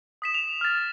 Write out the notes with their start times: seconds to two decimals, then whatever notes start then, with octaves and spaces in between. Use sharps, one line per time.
0.22 D#6 B6 E7
0.34 F7
0.61 F6 A6